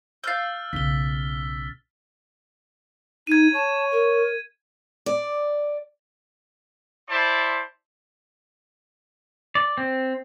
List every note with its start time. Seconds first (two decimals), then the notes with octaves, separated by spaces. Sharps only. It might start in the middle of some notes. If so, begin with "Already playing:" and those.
0.24 F5 E6 F6 G6 A6
0.73 B1 C#3 B6 G7
3.27 D#4 G#6 D#7
3.54 C#5 A5
3.92 A#4
5.06 D5
7.09 E4 C5 D5 A5 C6
9.55 D5
9.78 C4